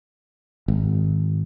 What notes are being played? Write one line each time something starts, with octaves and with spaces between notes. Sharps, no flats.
G#1